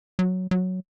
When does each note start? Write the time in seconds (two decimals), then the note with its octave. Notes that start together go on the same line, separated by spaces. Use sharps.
0.19 F#3
0.51 F#3